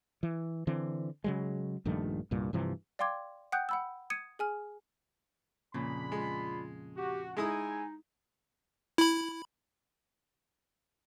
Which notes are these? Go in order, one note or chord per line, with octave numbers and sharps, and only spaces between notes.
E3
D3 E3 C4
C#3 F#3 G#3
A#1 G2 D#3 A3
C2 G2 A#2
G2 C3 E3 F3
D5 F5 G5 C6 D6 G#6
F#5 G5 D#6 F#6 G6
F#5 B5 E6
D#6 G#6 C#7 D#7
G#4 G#5 F6
F2 A#2 C#3 D4 G#4 B5
G#3 F4
F#4 G4
G#3 D#4 E4 G#5 D#6
E4 B5